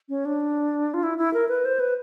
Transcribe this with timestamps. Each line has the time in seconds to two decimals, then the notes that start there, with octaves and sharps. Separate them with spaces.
0.09 C#4
0.25 D4
0.94 F4
1.03 E4
1.18 E4
1.34 A#4
1.49 B4
1.65 C5
1.80 B4